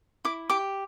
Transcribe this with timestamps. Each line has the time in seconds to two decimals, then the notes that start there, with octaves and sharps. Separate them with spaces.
0.25 E4 D6
0.50 G4 D6